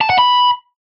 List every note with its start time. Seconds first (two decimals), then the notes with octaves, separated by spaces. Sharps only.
0.01 A5
0.10 F#5
0.19 B5